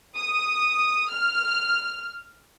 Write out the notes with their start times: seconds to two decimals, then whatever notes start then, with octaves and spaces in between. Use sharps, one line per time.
0.17 D#6
1.10 F6